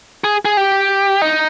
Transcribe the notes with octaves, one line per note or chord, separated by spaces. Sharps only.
G#4
G#4
G4
D#4